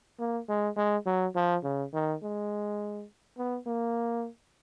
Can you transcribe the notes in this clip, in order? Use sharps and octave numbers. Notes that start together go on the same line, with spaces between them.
A#3
G#3
G#3
F#3
F3
C#3
D#3
G#3
B3
A#3